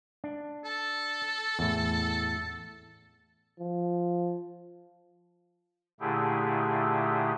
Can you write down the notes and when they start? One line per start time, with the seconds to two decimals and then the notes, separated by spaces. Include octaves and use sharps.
0.24 D4
0.64 A4
1.59 E2 A2
3.60 F3
6.00 A#2 D3 A3 E4 G4 G#4